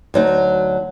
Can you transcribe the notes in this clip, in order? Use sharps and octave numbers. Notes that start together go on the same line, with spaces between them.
D2 F#3 D#4